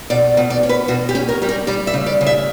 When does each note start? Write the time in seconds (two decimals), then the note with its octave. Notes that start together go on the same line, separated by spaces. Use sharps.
0.10 B2 D5
0.37 B2
0.50 D5
0.63 C#4
0.69 B4
0.88 B2 F#4
1.09 G4
1.15 C#4
1.29 A#4
1.42 G3 G4
1.49 A#4
1.67 G3 D5
1.87 E5
1.94 C#3
2.06 D5
2.21 C#3
2.26 E5